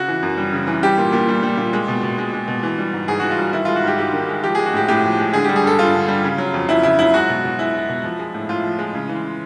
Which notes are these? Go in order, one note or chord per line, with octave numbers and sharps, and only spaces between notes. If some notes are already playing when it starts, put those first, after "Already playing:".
Already playing: C#3 F#4
E3
F#2
G3
C#3
E3
G3 G4
A#2
A#2
G3
G3
A#2
G#3
B2
B2
G#3
G#3
B2
E3
G3
G#2
G#2 G#4
E3 F#4
F4
G3 F#4
D#3 E4
G#3 F4
F#4
G#2 G4
G#2 G4
D#3
G#3
F3 G4
G#3 G#4
F#4
A2 G4
A2 G4
F3
G#3
D3 G#4
G3 G4
G#4
G2 A4
G2 F4
D3
G3
C#3
F#3
F2
F2 E4
C#3 E4
F#3 E4
G#3 F#4
B2
B2
G#3 E4
G#3
B2
F3
G#3
A2
A2 F4
F3
G#3
C#3
E3